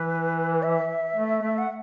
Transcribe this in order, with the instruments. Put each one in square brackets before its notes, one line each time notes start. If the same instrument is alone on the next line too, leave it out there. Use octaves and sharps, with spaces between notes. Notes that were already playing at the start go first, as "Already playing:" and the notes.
Already playing: [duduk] E3 [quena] B4
[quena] E5
[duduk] A3
A3
[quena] F#5